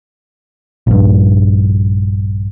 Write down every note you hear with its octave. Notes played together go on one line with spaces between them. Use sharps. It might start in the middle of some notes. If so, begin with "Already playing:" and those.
A#1 G2